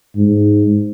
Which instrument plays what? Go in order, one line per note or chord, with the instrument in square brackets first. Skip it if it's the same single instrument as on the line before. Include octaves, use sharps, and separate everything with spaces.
[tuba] G#2